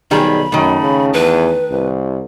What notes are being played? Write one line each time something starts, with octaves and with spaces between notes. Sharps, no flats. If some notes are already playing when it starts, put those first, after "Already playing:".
B1 D#3 G3 G#4 B5
F#2 D#3 A3
C#3
E2 B4
C2